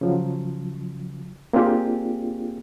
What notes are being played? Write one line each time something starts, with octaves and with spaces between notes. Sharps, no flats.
C#3 F3 F#3
A#3 C4 D4 F4 G4 G#4